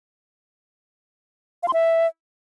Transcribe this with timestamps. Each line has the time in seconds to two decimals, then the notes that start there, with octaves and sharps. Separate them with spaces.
1.63 F5
1.68 C6
1.73 E5